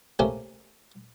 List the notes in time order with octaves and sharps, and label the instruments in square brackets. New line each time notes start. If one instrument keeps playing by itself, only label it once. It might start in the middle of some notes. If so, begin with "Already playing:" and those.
[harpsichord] C3 A3 A#3 C#4 G4